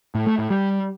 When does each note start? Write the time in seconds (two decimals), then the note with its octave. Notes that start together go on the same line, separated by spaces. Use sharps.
0.15 A2
0.27 A3
0.38 A2
0.50 G3